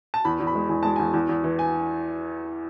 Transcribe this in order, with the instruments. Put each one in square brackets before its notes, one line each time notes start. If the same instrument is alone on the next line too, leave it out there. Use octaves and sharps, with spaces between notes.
[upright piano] A5
E2 B5
E2
B5
G#3
E2 G#5
G#3 A5
G#5
E2
E2
E2
E3
G#5